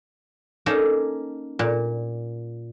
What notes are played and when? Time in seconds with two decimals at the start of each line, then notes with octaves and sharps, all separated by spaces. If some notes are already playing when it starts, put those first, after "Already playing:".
0.66 A#3 C#4 D#4 A4
1.59 A#2